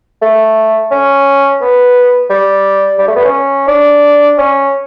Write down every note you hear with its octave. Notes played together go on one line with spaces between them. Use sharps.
A3
C#4
B3
G3
G3
A3
B3
C#4
D4
C#4